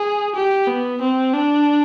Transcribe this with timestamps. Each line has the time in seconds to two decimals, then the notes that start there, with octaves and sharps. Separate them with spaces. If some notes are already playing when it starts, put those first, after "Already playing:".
Already playing: G#4
0.35 G4
0.68 B3
1.01 C4
1.34 D4